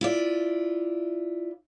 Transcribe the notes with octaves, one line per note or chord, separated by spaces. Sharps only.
E4 F4 D5